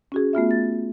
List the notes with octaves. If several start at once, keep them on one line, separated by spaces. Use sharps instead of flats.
C#4 F#4 G#4
A3 B3 F4 E5
A6